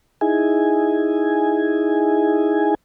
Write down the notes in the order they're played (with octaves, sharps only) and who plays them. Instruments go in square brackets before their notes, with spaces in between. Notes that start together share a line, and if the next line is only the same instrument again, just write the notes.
[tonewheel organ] D#4 E4 G#4 G#5